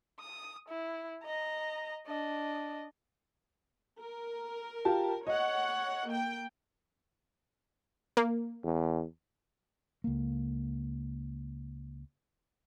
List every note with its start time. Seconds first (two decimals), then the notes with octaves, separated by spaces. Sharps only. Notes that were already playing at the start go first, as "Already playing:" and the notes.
0.20 D#6
0.68 E4
1.23 D#5 A#5
2.06 D4 D#5
3.99 A#4
4.85 F4 G4 A5
5.27 C#5 D#5 F#5
6.07 A#3 G5
8.17 A#3
8.64 E2
10.04 C#2 A#3